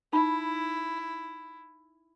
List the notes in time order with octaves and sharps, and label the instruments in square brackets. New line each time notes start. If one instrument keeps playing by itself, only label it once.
[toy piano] D#4 B5 [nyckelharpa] E4